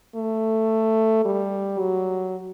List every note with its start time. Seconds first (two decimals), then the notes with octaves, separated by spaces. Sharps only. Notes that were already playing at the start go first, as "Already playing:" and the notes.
0.15 A3
1.25 G3
1.80 F#3